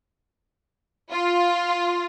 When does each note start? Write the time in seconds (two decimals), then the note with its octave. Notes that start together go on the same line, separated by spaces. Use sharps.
1.12 F4